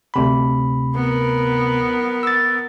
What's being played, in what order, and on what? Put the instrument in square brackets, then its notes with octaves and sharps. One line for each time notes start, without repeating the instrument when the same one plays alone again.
[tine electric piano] D2 C3 B5
[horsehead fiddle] B3 A#4
[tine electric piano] E6 A6